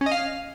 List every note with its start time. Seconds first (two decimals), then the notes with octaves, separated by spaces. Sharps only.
0.01 C#4
0.06 D#5
0.11 F5